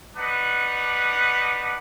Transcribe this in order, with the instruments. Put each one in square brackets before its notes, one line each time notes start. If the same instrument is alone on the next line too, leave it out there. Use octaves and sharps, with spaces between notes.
[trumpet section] D4 D#4 B4 F#5